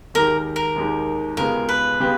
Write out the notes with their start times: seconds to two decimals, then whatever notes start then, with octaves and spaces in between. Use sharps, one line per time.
0.14 D#2 D#3 G#3 D#4 G4 A#4
0.56 A#4
0.76 D#2 D#3 G#3 D#4 G4
1.37 C#2 C#3 G#3 B3 G4 A#4
1.69 B4
2.00 C#3 G#3 B3 G4